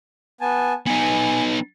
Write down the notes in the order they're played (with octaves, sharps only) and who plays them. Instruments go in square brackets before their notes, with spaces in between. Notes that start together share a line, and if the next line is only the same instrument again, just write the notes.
[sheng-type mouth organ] B3 G#5 A5
[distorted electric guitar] B3 D#4 [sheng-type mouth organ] G#5